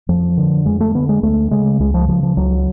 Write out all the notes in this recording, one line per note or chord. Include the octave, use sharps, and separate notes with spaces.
F2 F3
D3
F2 G#3
A3
D3 B3
G#3
D2 A3
C#3 G#3
C#2 G#3
F3
C#3 F3
F3
C#2 F#3